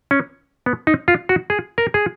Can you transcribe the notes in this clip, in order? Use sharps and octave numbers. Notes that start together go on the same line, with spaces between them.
C#4
B3
D#4
F4
F#4
G#4
A#4
G#4